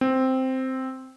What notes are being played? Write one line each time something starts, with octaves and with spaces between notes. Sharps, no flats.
C4